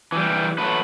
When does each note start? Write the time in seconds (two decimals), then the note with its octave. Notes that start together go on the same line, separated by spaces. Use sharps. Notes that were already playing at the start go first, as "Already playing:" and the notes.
0.12 E3 G3
0.58 F#3 A3 B4